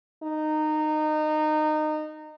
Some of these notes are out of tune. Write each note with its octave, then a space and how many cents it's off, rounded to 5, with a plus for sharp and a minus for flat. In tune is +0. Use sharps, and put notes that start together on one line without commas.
D#4 -20